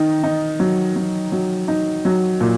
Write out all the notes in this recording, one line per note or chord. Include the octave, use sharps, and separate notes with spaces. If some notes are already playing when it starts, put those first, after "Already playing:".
Already playing: D#3 D#4
D#4
F#3
F#3
F#3
D#4
F#3
A#2